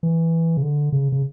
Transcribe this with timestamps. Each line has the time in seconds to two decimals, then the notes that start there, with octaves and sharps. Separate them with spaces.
0.03 E3
0.57 C#3
0.63 D3
0.92 C#3
1.12 C#3